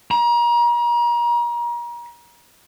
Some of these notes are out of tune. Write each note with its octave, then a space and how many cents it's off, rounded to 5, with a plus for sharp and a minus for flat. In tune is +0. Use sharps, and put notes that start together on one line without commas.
A#5 +35